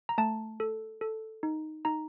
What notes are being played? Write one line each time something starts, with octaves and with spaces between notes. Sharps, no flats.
A#5
A3 A5
A4
A4
D#4
D#4 A#5